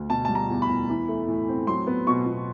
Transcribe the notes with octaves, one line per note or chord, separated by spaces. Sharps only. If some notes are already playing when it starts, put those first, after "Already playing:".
Already playing: D2
B2 A5
G3 A5
A#5
E2
B5
E2
E3
A3
A2
C4
F#3 C6
B3
B2 C#6
B2